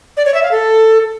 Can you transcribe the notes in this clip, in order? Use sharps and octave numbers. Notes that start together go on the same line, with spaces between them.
D5
C#5
E5
F5
A4